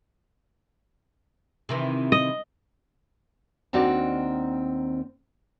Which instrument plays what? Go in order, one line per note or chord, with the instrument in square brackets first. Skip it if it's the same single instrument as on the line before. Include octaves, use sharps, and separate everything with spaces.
[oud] C3 D#3 E3
[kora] D#5
[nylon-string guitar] D#2 D#3 C4 D4 F#4 D5